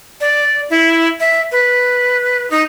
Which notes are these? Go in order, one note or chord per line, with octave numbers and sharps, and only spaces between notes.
D5
E4
E5
B4
D#4